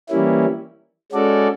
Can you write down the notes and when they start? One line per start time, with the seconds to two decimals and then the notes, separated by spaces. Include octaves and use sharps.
0.09 E3 G3 A#3 C#4 E4
1.12 G#3 C#4 F#4 A4 D5